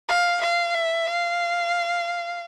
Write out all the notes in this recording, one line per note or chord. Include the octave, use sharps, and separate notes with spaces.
F5
F5
E5
F5